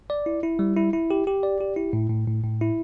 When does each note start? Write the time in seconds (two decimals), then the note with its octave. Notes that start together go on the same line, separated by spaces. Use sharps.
0.10 D5
0.26 E4
0.43 E4
0.59 G3
0.77 E4
0.93 E4
1.11 G4
1.27 G4
1.43 D5
1.61 G4
1.76 E4
1.93 A2
2.10 A2
2.27 A2
2.44 A2
2.61 E4